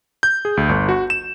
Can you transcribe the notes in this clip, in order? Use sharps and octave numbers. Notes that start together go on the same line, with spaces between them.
G6
G#4
D2
G1
F#4
E7